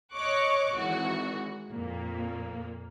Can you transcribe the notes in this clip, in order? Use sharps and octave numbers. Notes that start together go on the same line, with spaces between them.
C#5 D#5 C#6 D6 F#6
G#1 E3 F#4
F2 A#2 A#3